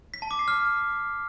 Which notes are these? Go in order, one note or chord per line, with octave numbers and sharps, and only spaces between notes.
B6
A5
D6
C7
F6